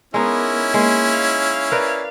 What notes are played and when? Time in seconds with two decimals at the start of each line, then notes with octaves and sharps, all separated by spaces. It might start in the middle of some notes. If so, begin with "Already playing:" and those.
0.14 G#3 B3 C#4 D#4 E4 A#4
0.74 G#3 A#3
1.12 F5
1.72 A#4 B4 D5